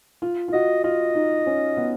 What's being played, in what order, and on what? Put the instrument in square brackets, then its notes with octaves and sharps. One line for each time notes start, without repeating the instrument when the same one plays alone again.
[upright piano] F4
F4
[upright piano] F#4 [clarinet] D#5
[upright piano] F4 [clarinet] D#5
[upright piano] D#4
C#4
B3